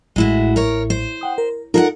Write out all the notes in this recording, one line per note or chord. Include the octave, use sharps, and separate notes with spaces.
A1 A2 G#3 E4 F#4
A#4 C#5
C5
F#5 G5 D#6
A#4
D#4 F4 A4 A#4 F5 F#5